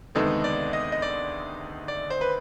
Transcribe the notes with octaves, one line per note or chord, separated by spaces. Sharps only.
D2 C3 D#3 G#3 B3 A4
D5
D#5
D#5
D5
D5
C5
B4